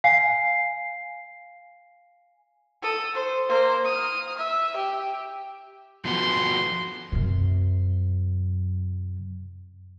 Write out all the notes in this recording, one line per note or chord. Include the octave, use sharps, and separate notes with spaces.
F5 G#5 C7
A4 D#6
C5
A#3 C5
D#6 F6
E5
G4
F3 B3 F#4 C6
F#2 C3